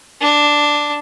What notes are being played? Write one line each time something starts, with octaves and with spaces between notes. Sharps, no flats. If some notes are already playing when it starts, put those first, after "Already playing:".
D4